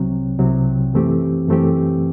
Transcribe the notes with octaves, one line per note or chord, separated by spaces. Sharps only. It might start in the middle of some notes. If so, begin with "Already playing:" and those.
Already playing: C2 C3 F#3 C4
C2 C3 F#3 C4
F#2 E3 A3 C4 G4
F#2 E3 A3 C4 G4